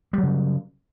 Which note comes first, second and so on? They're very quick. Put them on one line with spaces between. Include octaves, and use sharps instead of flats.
G3 F#3 C#3